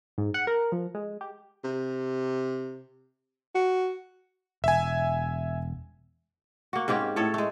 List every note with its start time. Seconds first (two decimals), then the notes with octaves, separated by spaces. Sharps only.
0.18 G#2
0.34 F#5
0.47 A#4
0.72 F3
0.95 G#3
1.21 G4
1.64 C3
3.55 F#4
4.64 E1 E5 G#5
6.73 A#3 F#4
6.88 G#2 C4 C#4 G4
7.16 A2 A4 C#5
7.34 G#3 A3